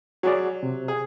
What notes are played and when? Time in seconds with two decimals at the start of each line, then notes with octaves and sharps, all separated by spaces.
0.23 F#3 F#4 G#4 D5
0.63 C3
0.88 G#4